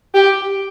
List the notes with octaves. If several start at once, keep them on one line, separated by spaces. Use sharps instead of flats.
G4